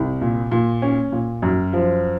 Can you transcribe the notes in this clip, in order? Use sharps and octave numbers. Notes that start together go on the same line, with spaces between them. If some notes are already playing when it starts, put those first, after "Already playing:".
Already playing: C2
A#2
A#2
C#4
A#2
F#2
F3